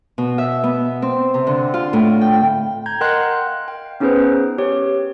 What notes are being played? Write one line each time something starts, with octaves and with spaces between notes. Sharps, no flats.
B2
E5
B3
C4
C3
D3
F4
A2
G5
A#5 G6 G#6
A#4 D#5 F#5 G5 C6 F#6
F5
G5
B3 C#4 D#4 G#4 B4 C5
G4 C#5